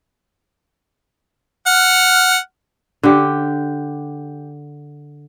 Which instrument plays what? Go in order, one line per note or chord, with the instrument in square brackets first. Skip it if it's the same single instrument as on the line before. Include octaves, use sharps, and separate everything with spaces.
[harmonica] F#5 F6
[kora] D3 G4